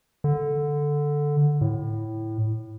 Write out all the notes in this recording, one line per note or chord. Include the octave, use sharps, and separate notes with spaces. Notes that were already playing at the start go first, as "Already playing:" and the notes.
D3
A2